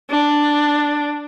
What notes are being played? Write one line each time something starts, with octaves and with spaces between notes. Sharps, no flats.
D4